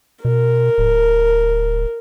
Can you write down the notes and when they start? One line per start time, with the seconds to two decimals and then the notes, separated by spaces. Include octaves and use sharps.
0.25 B2 A#4
0.78 D1